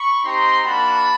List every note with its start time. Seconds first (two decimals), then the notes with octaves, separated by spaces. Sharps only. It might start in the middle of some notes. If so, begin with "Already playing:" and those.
Already playing: B5 C#6
0.23 C4 D#4 G4 A#5 C6
0.65 A#3 D4 F#4 A5 B5